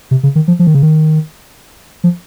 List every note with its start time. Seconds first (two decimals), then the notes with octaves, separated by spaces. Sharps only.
0.11 C3
0.23 C#3
0.35 D#3
0.48 F3
0.59 F3
0.67 D#3
0.75 C#3
0.82 D#3
2.04 F3